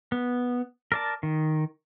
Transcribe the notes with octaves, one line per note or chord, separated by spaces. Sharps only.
B3
A#4 D5 A5
D#3